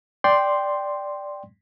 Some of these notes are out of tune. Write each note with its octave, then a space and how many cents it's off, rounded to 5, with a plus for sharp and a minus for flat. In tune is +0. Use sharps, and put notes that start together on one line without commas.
D5 +0 G5 +0 C6 +0